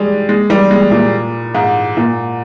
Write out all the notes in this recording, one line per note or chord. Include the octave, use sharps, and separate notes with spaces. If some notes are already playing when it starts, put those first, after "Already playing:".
Already playing: G3 G#3
G#3
G3
G#3
A#2
G#2
A#2